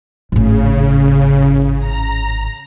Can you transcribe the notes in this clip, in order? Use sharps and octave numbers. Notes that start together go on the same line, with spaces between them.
G#1 A2 C#3
A#5